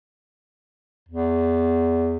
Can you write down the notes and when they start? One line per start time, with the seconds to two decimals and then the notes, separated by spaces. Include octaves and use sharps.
1.09 E2